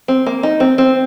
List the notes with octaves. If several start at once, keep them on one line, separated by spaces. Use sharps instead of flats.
C4
A#3
D#4
C4
C4